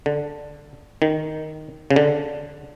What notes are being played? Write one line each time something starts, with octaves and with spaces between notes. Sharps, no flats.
D3
D#3
C#3
D3